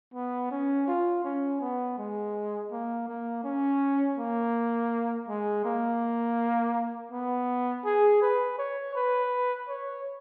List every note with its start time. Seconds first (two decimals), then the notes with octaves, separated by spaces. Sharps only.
0.14 B3
0.51 C#4
0.88 F4
1.24 C#4
1.61 B3
1.98 G#3
2.71 A#3
3.08 A#3
3.44 C#4
4.18 A#3
5.28 G#3
5.65 A#3
7.12 B3
7.85 G#4
8.22 B4
8.58 C#5
8.95 B4
9.69 C#5